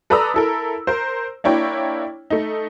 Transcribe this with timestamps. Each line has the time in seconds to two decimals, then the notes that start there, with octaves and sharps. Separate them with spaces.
0.10 A4 B4 D5 A#5 D#6 E6
0.34 E4 A4 A#4
0.87 A#4 C5
1.44 A#3 D4 E4 C#5 G5
2.30 A3 D#4